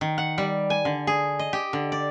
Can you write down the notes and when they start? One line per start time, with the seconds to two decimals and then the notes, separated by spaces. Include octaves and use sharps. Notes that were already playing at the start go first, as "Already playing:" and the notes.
0.01 D#3
0.18 F#5
0.38 G3
0.70 G#5
0.85 D3
1.07 G#4
1.39 D#5
1.53 G4
1.73 D3
1.92 D5